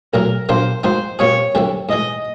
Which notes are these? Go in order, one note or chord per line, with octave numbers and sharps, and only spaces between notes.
B1 A2 F#3 A#4
B1 A#2 F#3 A#3 D4 C5
G#2 F3 A#3 D#4 F#4 C5
A#2 G3 C4 F4 G#4 C#5
F#2 D3 G3 C4 E4
G#2 E3 G#3 D#5